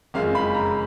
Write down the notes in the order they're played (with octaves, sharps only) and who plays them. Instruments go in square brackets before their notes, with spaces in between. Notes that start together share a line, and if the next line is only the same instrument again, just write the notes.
[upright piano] F#1 F2 C#3 G#3 F5
B5
A#5